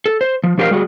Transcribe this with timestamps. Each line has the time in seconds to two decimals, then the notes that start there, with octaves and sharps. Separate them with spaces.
0.06 A4
0.21 C5
0.44 F3
0.58 F3 D4 G4 A#4 C5 F5
0.71 G3 F#4 G#4